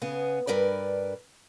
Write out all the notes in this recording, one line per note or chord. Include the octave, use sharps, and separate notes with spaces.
C#3 B3 G#4
G2 A#4 B4 D5